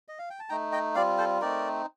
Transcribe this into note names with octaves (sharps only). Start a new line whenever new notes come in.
D#5
F5
G5
A5
A3 D#4 G5 A#5
D#5 G5
G3 C4 F4 D5 F5
A4 C5
A3 C4 D#4 A#4 D5